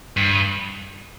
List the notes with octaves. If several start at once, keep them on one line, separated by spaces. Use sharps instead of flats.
G2